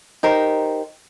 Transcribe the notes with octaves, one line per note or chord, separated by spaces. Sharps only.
D#4 G4 A#4 C5